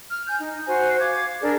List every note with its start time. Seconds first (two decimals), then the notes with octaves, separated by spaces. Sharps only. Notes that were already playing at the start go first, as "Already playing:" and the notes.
0.10 F6
0.27 G#5 G6
0.40 D#4
0.66 F#4 C5 G#5
1.00 F5 D6 G#6
1.41 D4 G#4 A#4 D5